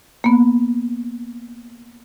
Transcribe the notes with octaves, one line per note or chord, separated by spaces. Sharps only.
A#3 B3